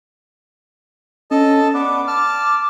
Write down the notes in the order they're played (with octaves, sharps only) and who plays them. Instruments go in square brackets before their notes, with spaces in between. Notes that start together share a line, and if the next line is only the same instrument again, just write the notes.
[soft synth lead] C#4 [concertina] A4 D#5 A5
[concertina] B3 D4 B4 [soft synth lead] D6
[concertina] A5 F6